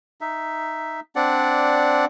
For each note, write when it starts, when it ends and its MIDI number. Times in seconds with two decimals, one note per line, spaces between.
0.21 1.00 63
0.21 1.00 76
1.16 2.05 60
1.16 2.05 62
1.16 2.05 74
1.16 2.05 78